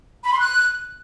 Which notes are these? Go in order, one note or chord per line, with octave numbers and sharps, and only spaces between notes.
B5
C6
F#6